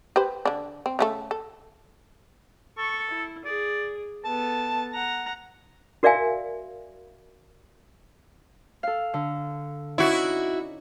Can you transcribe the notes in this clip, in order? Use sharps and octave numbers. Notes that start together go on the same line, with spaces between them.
G4 B4 C5
D3 D4
C4
C#3 A3 A4
A4
A4 C#6
E4
G#4 D5
B3 A4 A5
F#5 A#5
F#4 A#4 D5 E5 F5 G#5
A4 F5
D3
C#4 D#4 E4 F#4 D5